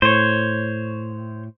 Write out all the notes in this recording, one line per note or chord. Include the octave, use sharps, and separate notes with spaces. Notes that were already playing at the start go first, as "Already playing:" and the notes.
A2 C5 C#5